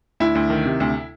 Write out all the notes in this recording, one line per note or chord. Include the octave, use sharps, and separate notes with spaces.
D2 E4
D2
D#3
C3
D2